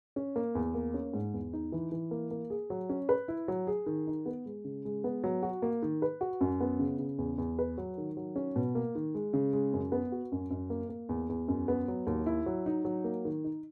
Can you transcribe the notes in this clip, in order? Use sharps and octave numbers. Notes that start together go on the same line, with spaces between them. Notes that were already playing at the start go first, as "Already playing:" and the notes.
C#4
A#3
E2
A#3
C#4
G#2
E2
D#4
E3
E3
A#3
A#3
G#4
F#3
C#4
B4
E4
F#3
G#4
D#3
D#4
B3
G#3
C#3
G#3
B3
F#3
F#4
A#3
D#3
B4
F#4
F#2
B3
C#3
C#3
E2
E2
B4
F#3
D#3
F#3
C#4
B2
A#3
D#3
G#3
C#3
G#3
F#2
B3
F#4
F#2
F#2
A#3
A#3
E2
E2
F#2
B3
F#3
D#2
E4
F#3
D#4
F#3
A#3
D#3
D#4